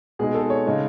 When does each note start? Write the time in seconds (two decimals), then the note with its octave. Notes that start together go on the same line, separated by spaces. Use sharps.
0.19 B2 G#3 D#4 G#4
0.34 A4
0.50 C#5
0.66 C#3 G#3 D#4